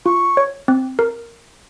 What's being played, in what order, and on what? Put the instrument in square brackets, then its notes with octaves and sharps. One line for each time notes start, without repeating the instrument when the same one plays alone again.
[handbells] F4 [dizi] C#6
[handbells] C#5
C4
A#4